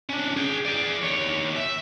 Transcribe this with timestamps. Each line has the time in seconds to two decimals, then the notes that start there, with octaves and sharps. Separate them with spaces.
0.09 C#4 D4
0.37 G#4 G5
0.65 G#4 D5
1.02 D#2 C#5
1.56 E5